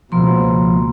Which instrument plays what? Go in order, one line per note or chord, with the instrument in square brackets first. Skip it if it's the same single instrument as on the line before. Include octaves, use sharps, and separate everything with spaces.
[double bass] C#2 B2 [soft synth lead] F3 [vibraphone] A#3 C6